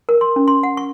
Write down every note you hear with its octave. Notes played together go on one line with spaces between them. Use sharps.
A#4
C6
C#4
C6
F#5
C#6